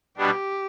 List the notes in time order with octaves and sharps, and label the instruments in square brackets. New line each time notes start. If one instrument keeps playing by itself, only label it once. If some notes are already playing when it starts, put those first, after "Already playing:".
[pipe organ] B2 G3 B3 D4 [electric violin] G4